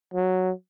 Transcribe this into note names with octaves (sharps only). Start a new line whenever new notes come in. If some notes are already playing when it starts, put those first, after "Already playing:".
F#3